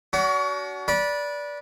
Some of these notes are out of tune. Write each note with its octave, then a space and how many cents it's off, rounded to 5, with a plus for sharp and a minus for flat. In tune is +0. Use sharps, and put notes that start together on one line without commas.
D4 -45 F#4 +25
B4 -25 D5 -10